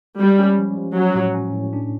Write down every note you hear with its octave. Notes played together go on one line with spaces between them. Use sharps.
G3 G#3
C#4
F3
F3
F#3 C#4
A2
C#4
A2
D4